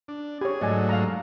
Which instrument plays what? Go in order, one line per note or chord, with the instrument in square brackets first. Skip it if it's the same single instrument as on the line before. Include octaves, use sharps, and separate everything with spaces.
[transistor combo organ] D4
[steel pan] G4 C#5 [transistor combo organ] G#4
[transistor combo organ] G#2 F#3 A3 [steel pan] D5 D#5 G#5
[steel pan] F5 A#5